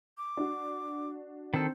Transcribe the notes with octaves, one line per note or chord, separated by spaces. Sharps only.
D6
D4 F#4
D#3 C4 A4 C5